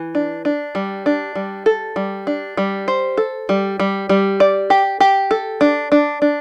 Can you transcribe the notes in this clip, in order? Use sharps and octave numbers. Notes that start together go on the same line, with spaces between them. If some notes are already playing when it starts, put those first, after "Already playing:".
Already playing: E3
D4
D4
G3
D4
G3
A4
G3
D4
G3
C5
A4
G3
G3
G3
D5
G4
G4
A4
D4
D4
D4